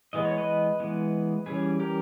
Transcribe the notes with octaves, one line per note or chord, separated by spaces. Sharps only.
E3 G#3 B3 D#5
C#5
B4 D#5
E3 G#3 B3
E3 G3 C#4 G#4 B4
G4 A#4